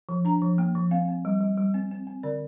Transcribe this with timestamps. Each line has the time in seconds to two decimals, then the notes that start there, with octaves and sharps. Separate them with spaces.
0.09 F3
0.25 D4 A#5
0.42 F3
0.58 A#3 G5
0.75 F3
0.91 C4 F5
1.08 C4
1.25 G3
1.41 G3
1.57 G3
1.74 C4
1.91 C4
2.07 C4
2.23 D3 D5